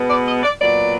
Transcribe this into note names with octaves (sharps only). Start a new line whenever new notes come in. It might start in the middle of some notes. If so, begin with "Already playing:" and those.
Already playing: B2 G#3 B3
D5
D#5
D5
A#2 F#3 B3 D5